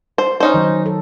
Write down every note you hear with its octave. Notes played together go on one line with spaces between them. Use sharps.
C5
C#4 D#4 C5
D#3 F#3
A4